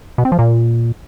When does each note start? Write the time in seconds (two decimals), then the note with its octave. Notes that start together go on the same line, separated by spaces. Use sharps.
0.18 B2
0.25 C4
0.32 F3
0.39 A#2